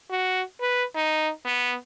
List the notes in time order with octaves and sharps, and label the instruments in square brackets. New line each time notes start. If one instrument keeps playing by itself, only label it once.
[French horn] F#4
B4
D#4
B3